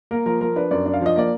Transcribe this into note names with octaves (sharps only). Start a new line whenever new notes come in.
A#3 A#4
F3 A#4
F3 A#4
D4 B4
F#2 D5
D4
F5
F3 D#5
A#3 D5